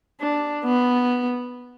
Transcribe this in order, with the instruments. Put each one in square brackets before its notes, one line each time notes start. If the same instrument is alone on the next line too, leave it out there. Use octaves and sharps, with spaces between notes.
[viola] D4
B3